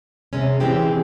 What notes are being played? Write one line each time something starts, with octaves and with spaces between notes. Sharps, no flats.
C3 G#3 C#4
E3 G#3 C4 G4